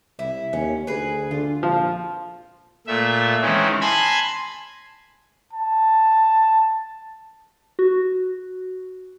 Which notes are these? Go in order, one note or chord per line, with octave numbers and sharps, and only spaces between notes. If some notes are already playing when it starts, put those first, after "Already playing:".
C2 E4
D#2 C#4
D2 G#4 B4
D3 F4
A#1 F3
A#2 A3 E5
D#3 E3 G#3 C4 C#4
G#5 A5 B5 C6 G#6 A#6
A5
F#4